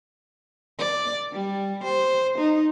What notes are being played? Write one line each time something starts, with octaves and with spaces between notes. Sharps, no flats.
D5
G3
C5
D#4